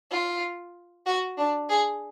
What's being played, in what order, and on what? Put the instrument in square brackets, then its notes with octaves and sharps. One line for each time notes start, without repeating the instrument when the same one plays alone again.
[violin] F4
F#4
D4
G#4